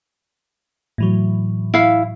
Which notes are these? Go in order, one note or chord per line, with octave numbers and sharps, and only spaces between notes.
A2 E3 F#3
E4 F5